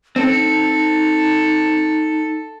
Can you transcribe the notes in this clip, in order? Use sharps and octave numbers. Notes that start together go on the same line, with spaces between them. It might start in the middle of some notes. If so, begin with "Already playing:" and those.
C4 D#4 A4